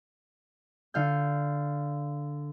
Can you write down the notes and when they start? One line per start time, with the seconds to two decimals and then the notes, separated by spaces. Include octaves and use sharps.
0.94 D3 F5 G6